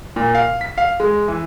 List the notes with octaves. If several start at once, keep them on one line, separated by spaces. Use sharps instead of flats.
A#2
F5
B6
F5
G#3
E3